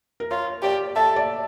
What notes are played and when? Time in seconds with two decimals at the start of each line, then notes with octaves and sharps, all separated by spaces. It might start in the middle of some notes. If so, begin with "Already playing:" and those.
0.20 A#4
0.31 F4 C#5
0.63 G4 D5
0.96 A4 E5
1.16 D5